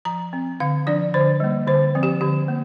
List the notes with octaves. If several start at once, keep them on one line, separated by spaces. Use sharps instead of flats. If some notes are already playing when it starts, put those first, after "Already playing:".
F3 A#5
C4
D3 F5
F3 D4 D5
D3 C5
G3 A#3
D3 C5
F3 C4
G4
D3 G4
A#3